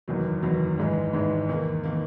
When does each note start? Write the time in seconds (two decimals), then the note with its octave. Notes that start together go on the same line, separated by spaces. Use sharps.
0.08 F#1 E2 D#3 F#3
0.42 F#1 E2 D#3 F#3
0.78 G#1 G#2 E3 G#3
1.13 G#1 G#2 E3 G#3
1.49 E2 D#3 A#3
1.84 D#3 A#3